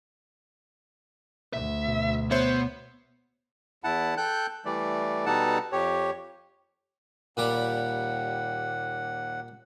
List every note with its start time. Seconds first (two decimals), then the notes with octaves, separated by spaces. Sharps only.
1.53 D2 E5
1.88 B2
2.31 B3 C5 C#5 E5
3.84 E2 E4 F#5 A5
4.17 A4 G5 F#6 G6
4.65 E3 G3 A3 D5
5.26 B2 G3 D#4 A4 F#5 A5
5.72 F2 G4 C#5
7.37 D#2 A#2 G3 G4 F#5